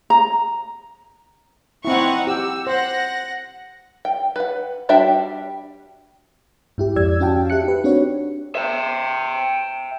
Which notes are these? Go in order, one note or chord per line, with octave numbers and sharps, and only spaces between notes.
A#5
C4 D#4 E4 F#5 C#6
G4 E6
C5 F#5 A#6
G5
B4 F#5
G3 D4 F#4 E5 G5
G#2 E4 G4
F2 D5 E6 G#6
C#4 F#4 F5 G5 A5
G4 E5 F#6 C#7
D#4 B4
C4 D4 F#4 G4 C#5
E5 G5